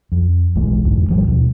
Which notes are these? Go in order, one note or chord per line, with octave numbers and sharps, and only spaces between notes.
F2
D1 B1 E3 G#3
F1 E2 G#2 D3
A1 F3 G3
D#2 B2